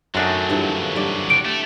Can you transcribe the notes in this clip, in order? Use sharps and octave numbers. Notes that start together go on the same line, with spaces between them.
F#2 D3 F#3 A3 C4 D4 D#4 F#4
G2 E3 F3
G2 C4 D5
G4 C5 F#5 D7
A3